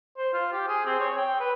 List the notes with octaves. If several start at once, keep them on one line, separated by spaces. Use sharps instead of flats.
C5
F4
G4
G#4
C4
C#5
G5
B4